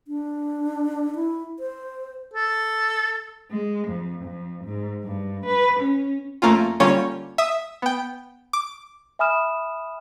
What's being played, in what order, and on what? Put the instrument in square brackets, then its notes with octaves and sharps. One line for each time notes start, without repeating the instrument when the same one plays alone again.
[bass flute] D4
E4
C5
[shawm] A4
[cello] G#3
F2
F2
G#2
G2
B4
C#4
[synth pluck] F2 A3 A#3 C#4 F4
D3 G3 A#3 C#4 F4 C#5
E5 D#6
B3 G5
D6
[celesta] E5 G#5 B5 D#6 F6 E7